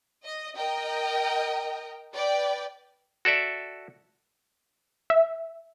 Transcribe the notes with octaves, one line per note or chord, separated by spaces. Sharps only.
D#5
A#4 D#5 G5
B4 D5 G5
F#4 A4 D5 E5
E5